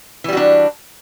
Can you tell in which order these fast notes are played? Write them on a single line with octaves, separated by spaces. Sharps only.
E3 G3 F#4 D4